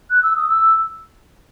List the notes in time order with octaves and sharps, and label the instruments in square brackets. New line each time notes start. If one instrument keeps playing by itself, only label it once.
[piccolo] F#6
E6
D#6
E6